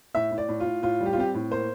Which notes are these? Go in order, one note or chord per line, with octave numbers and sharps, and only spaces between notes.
A2 E5
A2
D5
A2
F4
A2
A2 F4
G3
G4
F4
C4 G4
A2
A#3 C5